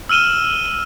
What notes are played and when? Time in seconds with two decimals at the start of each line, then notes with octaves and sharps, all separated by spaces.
0.09 E6 F6 D#7 E7 G7